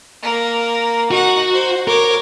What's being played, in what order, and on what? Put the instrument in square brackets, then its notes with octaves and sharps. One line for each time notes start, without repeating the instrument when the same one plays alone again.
[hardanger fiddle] A#3 A#4
[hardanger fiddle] D#4 F#5 [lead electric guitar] F#4
[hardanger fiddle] C5
[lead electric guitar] A#4 [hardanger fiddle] C#5 D6